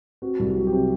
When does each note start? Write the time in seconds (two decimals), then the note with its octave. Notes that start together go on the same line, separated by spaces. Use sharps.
0.22 C4 F#4
0.39 C2 G4
0.56 F#3
0.67 G4
0.73 C3